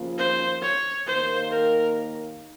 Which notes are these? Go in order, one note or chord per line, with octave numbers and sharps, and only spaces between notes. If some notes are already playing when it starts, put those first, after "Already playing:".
Already playing: D#2 C#3 F3 A#3 F4
C5
C#5
D#2 D#3 A#3 C5
A#4